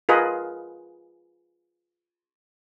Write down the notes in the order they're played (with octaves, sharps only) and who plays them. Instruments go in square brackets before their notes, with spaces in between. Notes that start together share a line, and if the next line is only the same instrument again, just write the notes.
[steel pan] F4 G#4 A#4 B4 D#5